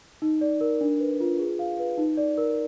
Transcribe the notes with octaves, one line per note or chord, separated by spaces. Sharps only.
D#4
D5
A#4
D4
B4
F4
G#4
F5
B4
D#4
D5
A#4